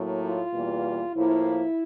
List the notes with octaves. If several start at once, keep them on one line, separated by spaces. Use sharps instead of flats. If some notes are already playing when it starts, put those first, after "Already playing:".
Already playing: A2 F#3 A#3
F4
E2 B2 G3 A#3
A2 F3 A#3 E4